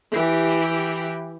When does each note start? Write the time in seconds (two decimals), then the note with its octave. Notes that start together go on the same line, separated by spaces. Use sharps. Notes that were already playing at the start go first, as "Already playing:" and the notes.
0.14 E3 G4